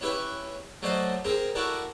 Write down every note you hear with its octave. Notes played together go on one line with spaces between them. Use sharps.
C#4 E4 G4 B4 E5
F#3 A3 A4 C5 D5 D#5
C4 G4 G#4 A#4
E4 F#4 G4 A4 A#4 D5